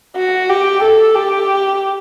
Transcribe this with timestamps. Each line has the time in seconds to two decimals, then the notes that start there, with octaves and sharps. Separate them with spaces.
0.16 F#4
0.49 G4
0.83 A4
1.15 G4